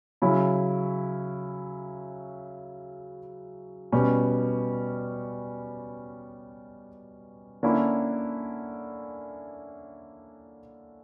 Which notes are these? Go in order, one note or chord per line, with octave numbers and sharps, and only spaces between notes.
C#3 F#3 C#4 E4
B2 G3 C#4
D3 A#3 C#4 E4